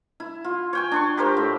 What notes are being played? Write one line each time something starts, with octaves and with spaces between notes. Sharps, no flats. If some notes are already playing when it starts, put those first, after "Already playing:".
E4
F4
C#5 G5 G#5
D4 C6 C#6
G4 A#4 C5 F5
A2